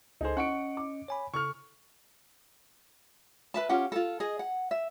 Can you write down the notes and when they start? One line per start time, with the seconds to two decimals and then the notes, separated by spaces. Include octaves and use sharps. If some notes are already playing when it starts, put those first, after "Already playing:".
0.21 C#2 D#4 G#4 A4 C5
0.37 C#4 D#5 F#5 C#6 C#7 D7
0.77 D6
1.08 C#5 G#5 B5
1.34 C#3 A4 C#6 F6
3.54 B4 E5 A5
3.69 C#4 F4 G4 F#5
3.92 F4 A4
4.20 G#4 D#5
4.39 F#5
4.71 E5